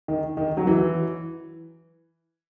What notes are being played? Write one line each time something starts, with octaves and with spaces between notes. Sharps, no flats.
D#3
D#3
F#3
E3